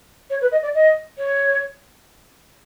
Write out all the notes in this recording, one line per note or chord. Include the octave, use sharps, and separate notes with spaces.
C#5
B4
D#5
D5
D#5
C#5